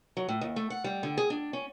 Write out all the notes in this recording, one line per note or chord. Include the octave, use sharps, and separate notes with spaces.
F#3
A2
D#2
A3
F#5
G3
D3
G#4
D4
C#4